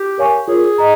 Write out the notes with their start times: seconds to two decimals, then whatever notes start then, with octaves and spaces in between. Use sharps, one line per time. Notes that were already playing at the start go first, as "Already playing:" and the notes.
Already playing: G4
0.18 A#4 C#5 F5 G#5 C#6
0.48 F4 G#4 A#4 C#5
0.78 D#5 A#5